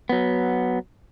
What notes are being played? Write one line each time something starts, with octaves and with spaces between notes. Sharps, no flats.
F#3 B3